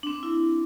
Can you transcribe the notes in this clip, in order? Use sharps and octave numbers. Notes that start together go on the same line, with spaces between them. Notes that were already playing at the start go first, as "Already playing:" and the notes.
D4
C4
E4